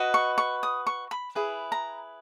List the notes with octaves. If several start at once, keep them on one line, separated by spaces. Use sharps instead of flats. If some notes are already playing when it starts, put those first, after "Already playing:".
Already playing: F#4 B4 D#5
C#6
C#6
D#6
C#6
B5
E4 G#4 B4
A#5